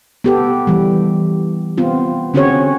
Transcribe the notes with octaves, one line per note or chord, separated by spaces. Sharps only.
B3 G4 A4
E3 G3
B3 C4 F4
D3 C4 C#4 F#4 G#4 C#5